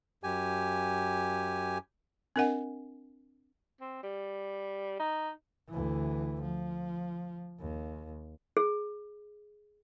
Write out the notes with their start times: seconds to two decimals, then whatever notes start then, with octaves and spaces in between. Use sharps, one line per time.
0.24 F#2 G4 G#5
2.36 C4 D4 A#4 D#5 F#5 G#5
3.81 C4
4.03 G3
4.99 D#4
5.69 D2 E3
6.42 F3
7.60 D#2
8.57 G#4